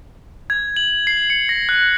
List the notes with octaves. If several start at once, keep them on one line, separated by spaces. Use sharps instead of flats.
G#6
F#7
C7
C#7
A#6
F#6